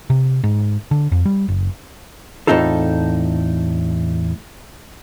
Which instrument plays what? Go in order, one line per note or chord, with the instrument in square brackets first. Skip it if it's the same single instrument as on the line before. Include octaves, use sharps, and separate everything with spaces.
[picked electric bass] C3
G#2
D3
F2
G3
F#1
[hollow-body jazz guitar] E2 A2 C4 D#4 F4 A4